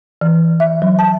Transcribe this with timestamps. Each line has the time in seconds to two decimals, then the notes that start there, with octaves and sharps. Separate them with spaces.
0.21 E3
0.60 E5
0.82 F#3
0.99 A5